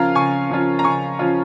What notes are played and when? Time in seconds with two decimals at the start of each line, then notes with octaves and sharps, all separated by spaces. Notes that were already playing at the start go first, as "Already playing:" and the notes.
Already playing: C#3 F3 C#4 F4 A#4 F5 A#5
0.15 C#3 G#5 C#6
0.50 F3 C#4 F4
0.79 A#5
0.84 C#3 G#5 C#6
1.19 F3 C#4 F4